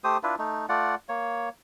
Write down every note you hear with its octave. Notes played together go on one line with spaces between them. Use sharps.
A3 G4 C5 D#6
D4 E4 F4 B4
A3 D#4
A3 F4 D5 F#5
A#3 C#5